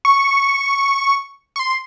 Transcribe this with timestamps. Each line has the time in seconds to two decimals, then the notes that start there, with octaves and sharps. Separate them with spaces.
0.05 C#6
1.56 C#6
1.59 C6